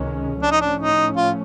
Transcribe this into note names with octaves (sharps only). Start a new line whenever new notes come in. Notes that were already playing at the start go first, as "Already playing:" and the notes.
Already playing: C#2 C3 D#3 G#3 C#4
A2 F3 A3 C#4 D4
D#4
D4
D#4
F4